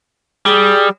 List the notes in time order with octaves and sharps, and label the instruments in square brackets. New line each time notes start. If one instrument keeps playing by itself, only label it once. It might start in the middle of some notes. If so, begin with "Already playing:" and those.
[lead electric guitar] G3 [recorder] G#4